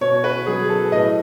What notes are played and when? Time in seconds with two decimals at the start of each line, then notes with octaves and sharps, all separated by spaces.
0.01 B2 C#5
0.24 B4
0.46 F#3 G#4
0.69 A4
0.92 A2 D#5